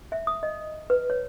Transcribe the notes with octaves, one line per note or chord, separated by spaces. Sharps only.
E5
D#6
D#5
B4
C#5